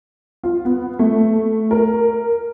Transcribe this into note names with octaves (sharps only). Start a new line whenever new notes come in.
F4
B3
A3
A#4